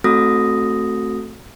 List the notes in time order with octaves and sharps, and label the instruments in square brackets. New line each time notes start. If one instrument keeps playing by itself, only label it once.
[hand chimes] A3 C4 F#4 A4 D#6 A#6